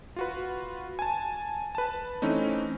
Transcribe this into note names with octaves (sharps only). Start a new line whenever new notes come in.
F4 F#4 B4
G#5 A5
B4 A5
E3 A3 C4 C#4 D#4